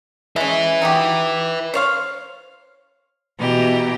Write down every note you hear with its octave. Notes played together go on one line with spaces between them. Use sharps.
G#3 C#4 B4 E5
D#4 F#4 G4
C5 C#5 F5
B2 E3 G4 A#5